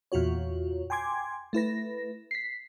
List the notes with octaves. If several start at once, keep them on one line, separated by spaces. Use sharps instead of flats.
E2 A#2 F4 F#4 C#5
G5 G#5 C6 D6 G#6
A3 E4 B4 A#6
B6 C7